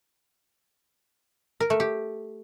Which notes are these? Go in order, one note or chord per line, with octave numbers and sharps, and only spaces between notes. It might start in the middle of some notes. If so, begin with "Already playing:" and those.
A#4
A3
G4